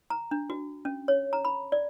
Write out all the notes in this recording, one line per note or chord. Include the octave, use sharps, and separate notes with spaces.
A#5
D4
F#4
C#4
C#5
A#5
B5
D5